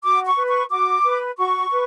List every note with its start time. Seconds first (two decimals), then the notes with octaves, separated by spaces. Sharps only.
0.03 F#4 D6
0.26 C#6
0.37 B4
0.48 C#6
0.71 F#4 D6
1.04 B4
1.37 F#4 C#6
1.71 B4